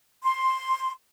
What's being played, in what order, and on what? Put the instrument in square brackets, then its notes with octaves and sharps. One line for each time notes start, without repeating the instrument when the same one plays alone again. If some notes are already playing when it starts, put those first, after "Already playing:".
[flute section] C6